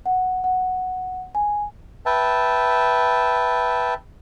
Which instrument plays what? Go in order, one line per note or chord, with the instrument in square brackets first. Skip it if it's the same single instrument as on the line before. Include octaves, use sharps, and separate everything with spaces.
[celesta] F#5
F#5
G#5
[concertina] B4 E5 G5 A5